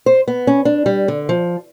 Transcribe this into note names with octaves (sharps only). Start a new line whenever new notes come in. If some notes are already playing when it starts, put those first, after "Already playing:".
C5
B3
C#4
D4
G3
D3
F3